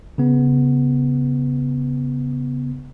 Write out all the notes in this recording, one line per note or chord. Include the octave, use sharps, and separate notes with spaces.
C#3 B3